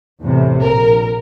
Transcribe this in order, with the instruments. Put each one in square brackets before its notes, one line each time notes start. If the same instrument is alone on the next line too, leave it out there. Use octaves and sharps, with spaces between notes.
[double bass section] E2 A2 C3
[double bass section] A#1 [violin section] A#4